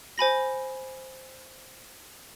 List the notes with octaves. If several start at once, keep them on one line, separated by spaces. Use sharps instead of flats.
C5 G#5 B5 A#6